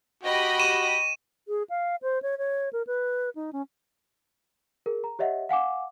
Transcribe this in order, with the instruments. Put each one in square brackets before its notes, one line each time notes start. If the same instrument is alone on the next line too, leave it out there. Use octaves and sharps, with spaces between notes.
[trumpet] F#4 [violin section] G4 D#5 B5
[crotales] C#6 D#7 E7
[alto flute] G#4
F5
C5
C#5
C#5
A#4
B4
D#4
C#4
[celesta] G#4 A#4
A#5
G4 C#5 D#5 E5 F#5
F5 F#5 G#5 D6